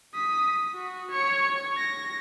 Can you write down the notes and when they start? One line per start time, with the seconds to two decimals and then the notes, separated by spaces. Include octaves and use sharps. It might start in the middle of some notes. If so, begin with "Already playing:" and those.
0.14 D#6 B6
0.75 F#4
1.11 C#5 C#7
1.48 C#5
1.77 A#6